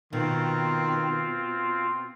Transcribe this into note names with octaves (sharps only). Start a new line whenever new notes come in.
B2 D#3 C4 F4